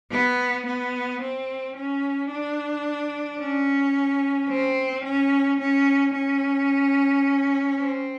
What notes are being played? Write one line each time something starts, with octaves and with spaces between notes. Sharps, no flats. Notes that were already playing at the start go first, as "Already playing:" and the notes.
B3
B3
C4
C#4
D4
C#4
C4
C#4
C#4
C#4
C4